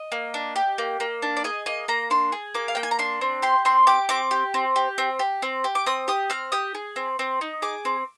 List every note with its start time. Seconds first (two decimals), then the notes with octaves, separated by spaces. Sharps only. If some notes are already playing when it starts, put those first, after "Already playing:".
Already playing: D#5
0.12 A#3
0.34 D4
0.56 G4
0.78 A#3
1.00 A#3
1.22 D4
1.37 D5
1.44 G#4 D#5
1.66 A#3 D#5
1.88 A#3 A#5
2.10 D4 C6
2.32 G#4
2.54 A#3 D6
2.68 F5
2.75 A#3 G5
2.83 G#5
2.91 A#5
2.99 D4 C6
3.21 C4
3.42 G4 C6
3.65 C4 C6
3.87 G4 D6
4.09 C4 D6
4.31 G4
4.54 C4
4.76 G4
4.98 C4
5.19 G4
5.42 C4
5.64 G4
5.75 D6
5.86 C4 D#6
6.08 G4 D#6
6.30 C4 F6
6.52 G4 D#6
6.75 G#4
6.96 C4
7.19 C4
7.41 D#4
7.62 G#4 D6
7.85 C4